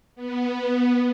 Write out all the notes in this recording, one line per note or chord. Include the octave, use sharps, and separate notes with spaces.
B3